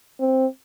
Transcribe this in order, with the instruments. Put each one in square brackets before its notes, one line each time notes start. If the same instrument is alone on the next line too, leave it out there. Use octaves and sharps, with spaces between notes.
[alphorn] C4